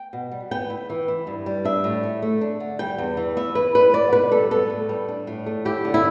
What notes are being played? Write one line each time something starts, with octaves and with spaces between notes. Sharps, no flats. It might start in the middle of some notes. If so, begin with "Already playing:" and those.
Already playing: G5
B2
G3
B3 G5
E4
E3
E4
G2
G3
D4 E5
A2
A3
A3
D4
D3
G3 G5
E2
E3
B3 E5
E4 B4
G3 B4
E4 D5
B2 B4
G3 A4
B3 A4
A2
G3
D4
A2
A3
E4 G4
D3
E4